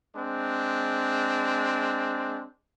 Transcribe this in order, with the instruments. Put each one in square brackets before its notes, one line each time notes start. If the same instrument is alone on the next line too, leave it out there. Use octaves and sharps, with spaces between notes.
[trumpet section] G#3 C4 D4